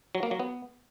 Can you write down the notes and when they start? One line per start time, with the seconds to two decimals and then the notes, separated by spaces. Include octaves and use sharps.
0.15 F#3
0.23 A#3
0.31 F#3
0.40 B3